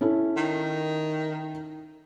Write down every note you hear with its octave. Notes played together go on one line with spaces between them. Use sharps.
C#4 E4 A4
D#3